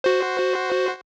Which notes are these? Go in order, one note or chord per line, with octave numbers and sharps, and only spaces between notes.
F#4 C5